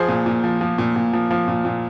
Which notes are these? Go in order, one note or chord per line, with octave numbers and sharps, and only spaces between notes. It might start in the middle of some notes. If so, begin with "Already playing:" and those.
Already playing: F3 G#4 C5
A#2
A#2
F3
F3
A#2
A#2
F3
F3
A#2
A#2